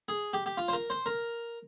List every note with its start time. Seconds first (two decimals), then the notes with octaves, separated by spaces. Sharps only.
0.08 G#4
0.33 G4
0.46 G4
0.57 F4
0.68 C5
0.73 A#4
0.90 C5
1.06 A#4